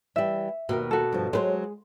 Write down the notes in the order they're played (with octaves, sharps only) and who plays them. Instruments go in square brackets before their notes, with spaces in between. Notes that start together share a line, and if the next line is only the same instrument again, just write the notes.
[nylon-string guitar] E3 G3 [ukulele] E5
[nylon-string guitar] D#2 A#4 [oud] B2 A#3
[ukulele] F#4 A4
[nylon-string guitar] G2 F3
[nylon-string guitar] F#3 B4 C5 [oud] G#3